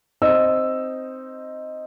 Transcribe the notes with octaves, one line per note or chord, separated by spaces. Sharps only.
C4 D#4 D#5 E6